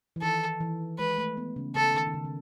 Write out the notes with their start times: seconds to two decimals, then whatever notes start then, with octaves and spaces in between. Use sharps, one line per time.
0.16 E3
0.22 D#3 A4
0.61 E3
0.98 G#3 B4
1.18 A3
1.37 B3
1.56 C#3
1.75 C#3 A4
1.94 D#3
2.07 D#3
2.14 C#3
2.25 C#3